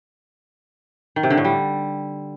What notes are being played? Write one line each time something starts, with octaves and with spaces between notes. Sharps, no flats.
D#3
C3
D3
A2
G3